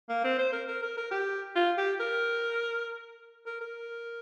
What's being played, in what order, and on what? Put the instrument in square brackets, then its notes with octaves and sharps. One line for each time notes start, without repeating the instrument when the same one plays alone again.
[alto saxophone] A#3
C4
C5
A#4
A#4
A#4
A#4
G4
F4
G4
A#4
A#4
A#4